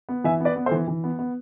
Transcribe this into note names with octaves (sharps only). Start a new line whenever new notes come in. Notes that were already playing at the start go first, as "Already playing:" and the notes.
B3
E3 E5 G#5
B3 B4 D5
B3
A4 C5
E3
E3
B3
B3